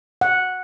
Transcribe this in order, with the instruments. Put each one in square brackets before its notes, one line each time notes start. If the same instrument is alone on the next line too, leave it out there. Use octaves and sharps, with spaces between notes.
[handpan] F#5